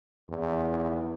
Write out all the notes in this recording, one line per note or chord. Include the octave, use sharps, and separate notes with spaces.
E2